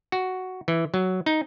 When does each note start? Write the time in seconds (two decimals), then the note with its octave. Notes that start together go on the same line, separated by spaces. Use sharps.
0.12 F#4
0.68 E3
0.94 F#3
1.26 D#4